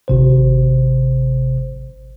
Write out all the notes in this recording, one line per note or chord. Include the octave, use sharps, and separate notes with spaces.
G#1 C3 C5